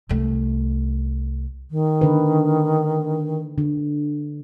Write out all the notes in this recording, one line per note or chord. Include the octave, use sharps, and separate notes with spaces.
C2 A3
D#3
D3 B4
D3